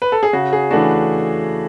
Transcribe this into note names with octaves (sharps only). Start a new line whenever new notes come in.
B4
A4
G#4
C#3 F#4
G#4
E3 A3 D4 F#4